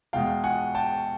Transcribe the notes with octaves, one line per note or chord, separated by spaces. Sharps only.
E2 B2 G#3 F5 G5
F#5 G#5
G5 A5